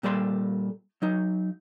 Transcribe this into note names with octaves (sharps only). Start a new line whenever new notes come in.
A#2 G3 A4 B4 C6
F#3 D#4